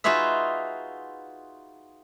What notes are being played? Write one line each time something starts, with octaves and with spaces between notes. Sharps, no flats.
D#4 F4 F#4 G#4 B4 E5